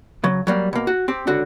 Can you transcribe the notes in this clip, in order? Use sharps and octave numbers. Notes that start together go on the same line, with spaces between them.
C#3 F#3
F#3 G3 A#3
B2 A#3
F#4
C4 G4
C#2 D3 F#4